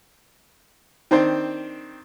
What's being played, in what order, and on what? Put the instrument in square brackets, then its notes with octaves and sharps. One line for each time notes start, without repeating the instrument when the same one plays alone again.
[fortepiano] D#3 C4 D4 C5